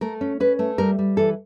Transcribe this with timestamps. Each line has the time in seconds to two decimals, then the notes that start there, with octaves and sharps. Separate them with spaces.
0.01 A3 A#4
0.21 C#4
0.40 C#4 B4
0.59 A3
0.78 G3 A#4
0.99 G3
1.17 E3 A4